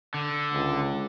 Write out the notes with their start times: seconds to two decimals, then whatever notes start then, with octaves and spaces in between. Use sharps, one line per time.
0.14 D3
0.53 C#2